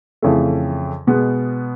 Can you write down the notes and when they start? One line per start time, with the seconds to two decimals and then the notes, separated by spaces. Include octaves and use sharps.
0.22 F2 C#3 E3 A3
1.07 B2 G#3 B3